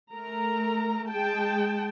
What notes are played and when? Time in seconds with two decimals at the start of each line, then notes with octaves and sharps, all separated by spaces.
0.13 A3 A#4 A#5
1.10 G#3 G#4 G5 A5